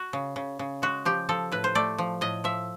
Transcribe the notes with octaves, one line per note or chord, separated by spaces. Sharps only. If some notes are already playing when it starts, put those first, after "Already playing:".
Already playing: F#4
C#3
C#3
C#3
G#3 F#4
F3 G4
F3 A4
A2 B4
C5
A3 D5
F3
A2 D#5
F3 E5